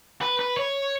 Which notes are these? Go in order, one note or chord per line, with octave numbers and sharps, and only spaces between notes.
B4
B4
C#5